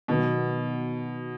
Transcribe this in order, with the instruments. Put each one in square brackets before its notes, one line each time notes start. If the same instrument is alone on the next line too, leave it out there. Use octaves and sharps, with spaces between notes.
[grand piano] B2 [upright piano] D#3 F#3 B3